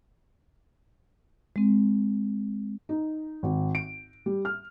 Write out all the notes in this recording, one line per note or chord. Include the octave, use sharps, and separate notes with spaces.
G#3 C4
D#4
G#1
D7
G3
F6